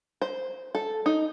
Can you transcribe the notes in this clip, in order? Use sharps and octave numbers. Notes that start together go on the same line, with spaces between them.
C5
A4
D#4